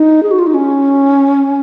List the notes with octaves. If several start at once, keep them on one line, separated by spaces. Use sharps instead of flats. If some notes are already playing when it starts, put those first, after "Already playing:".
Already playing: D#4
G#4
F#4
F4
D#4
C#4